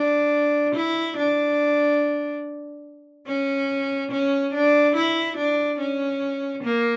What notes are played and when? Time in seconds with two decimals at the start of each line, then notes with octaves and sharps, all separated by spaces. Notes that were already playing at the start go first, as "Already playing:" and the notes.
Already playing: D4
0.75 E4
1.17 D4
3.27 C#4
4.11 C#4
4.53 D4
4.95 E4
5.37 D4
5.79 C#4
6.63 A#3